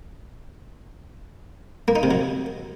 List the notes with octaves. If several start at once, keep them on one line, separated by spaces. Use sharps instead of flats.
A#3
D#4
C3
F#3